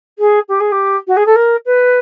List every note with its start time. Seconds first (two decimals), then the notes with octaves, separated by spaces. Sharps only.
0.18 G#4
0.48 G4
0.59 G#4
0.71 G4
1.07 F#4
1.16 G#4
1.26 A4
1.35 A#4
1.65 B4